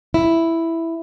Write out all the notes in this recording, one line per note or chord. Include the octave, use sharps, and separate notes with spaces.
E4